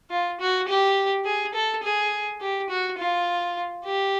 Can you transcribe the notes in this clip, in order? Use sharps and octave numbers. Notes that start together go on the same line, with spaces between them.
F4
F#4
G4
G#4
A4
G#4
G4
F#4
F4
G4